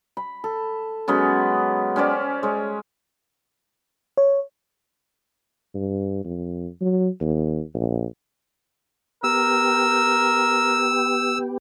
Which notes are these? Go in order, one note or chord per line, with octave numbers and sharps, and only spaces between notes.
B5
A4
F#3 G#3 B3 C#4
C#4 G4 C5 D5
G#3 C#5
C#5
G2
F2
F#3
D#2
A#1
B3 G4 A#4 E6